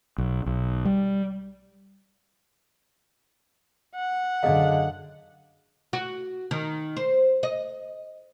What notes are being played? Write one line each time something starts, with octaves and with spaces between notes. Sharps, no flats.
B1
B1
G3
F#5
F#2 D3 G#4 D#5 F5
F#4
D#3
C5
D#5